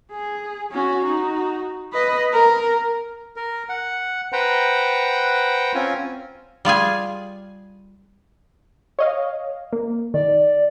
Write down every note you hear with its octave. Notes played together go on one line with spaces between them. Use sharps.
G#4
C#4 F#4
D#4 F#4
B4 D#5
A#4
A#4
F#5
B4 C5 F#5 G5 A#5
C4 C#4 F4 G#5
G3 F4 G#4 G#5
C#5 D#5 F5
A#3
D#3 D5